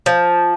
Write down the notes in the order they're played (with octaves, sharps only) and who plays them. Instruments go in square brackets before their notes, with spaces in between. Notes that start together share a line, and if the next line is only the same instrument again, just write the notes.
[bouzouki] F3